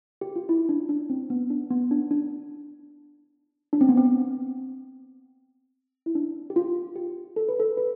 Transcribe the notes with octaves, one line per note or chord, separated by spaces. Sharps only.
G4
F4
E4
D4
D4
C4
B3
D4
B3
D4
D4
D4
C4
B3
C4
E4
D4
G4
F4
G4
A4
B4
A4
B4